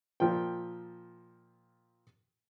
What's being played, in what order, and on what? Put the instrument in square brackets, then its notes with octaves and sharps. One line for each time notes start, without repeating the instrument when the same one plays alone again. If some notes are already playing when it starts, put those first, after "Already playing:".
[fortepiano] A#2 F3 F4 G5